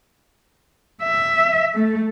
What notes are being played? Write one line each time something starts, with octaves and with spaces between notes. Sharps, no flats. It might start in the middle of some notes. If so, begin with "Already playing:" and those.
E5
A3